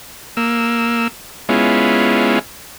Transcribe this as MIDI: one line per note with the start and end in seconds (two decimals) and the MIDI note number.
0.37 1.08 58
0.37 1.08 88
1.49 2.39 56
1.49 2.39 59
1.49 2.39 61
1.49 2.39 64
1.49 2.39 65